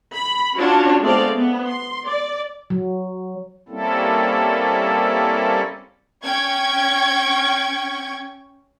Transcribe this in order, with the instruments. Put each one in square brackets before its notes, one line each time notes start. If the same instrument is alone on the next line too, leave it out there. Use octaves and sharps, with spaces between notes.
[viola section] B5
C#4 D4 F4 F#4 C#5
G#3 A3 B3 C4 D5 F5
B3
C6
D5
[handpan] F#3
[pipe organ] G3 A#3 C4 C#4 E4 A4
[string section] C#4 G5 C#6 G#6